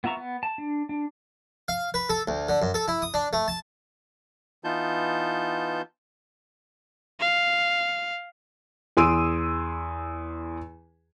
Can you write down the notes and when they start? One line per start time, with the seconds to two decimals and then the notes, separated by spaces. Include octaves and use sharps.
0.04 B3 F4 E5 A#5 C#6
0.17 B3
0.43 A5
0.58 D4
0.89 D4
1.68 F5
1.94 B4
2.09 A4
2.28 D2
2.49 D3
2.62 F#2
2.74 A4
2.88 E4
3.02 D#6
3.14 D4
3.33 A3
3.48 A5
4.64 E3 B3 D#4 F4 A5 G6
7.20 F5
8.97 E2 G#4 C6 E6 D7 D#7